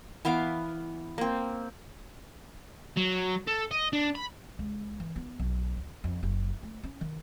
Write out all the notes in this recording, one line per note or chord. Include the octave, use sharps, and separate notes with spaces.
E3 B3 F5 D6
A#3 C4
F#3
A4
D#5
D4
B5
C#2
E3
B3
B1
D#2
F2
F#1
A3
C#4
D#3